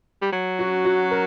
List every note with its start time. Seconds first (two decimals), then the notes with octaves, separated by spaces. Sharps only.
0.22 G3
0.33 F#3
0.59 F#4
0.85 F#4
1.11 A#4